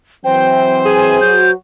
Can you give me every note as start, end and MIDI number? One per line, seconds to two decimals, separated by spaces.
0.24 1.16 52
0.24 1.16 54
0.24 1.16 60
0.24 1.51 72
0.24 0.79 79
0.85 1.38 68
0.85 1.19 80
1.21 1.52 54
1.21 1.52 66
1.21 1.51 91